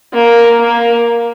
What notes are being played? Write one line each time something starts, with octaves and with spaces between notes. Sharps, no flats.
A#3
A#3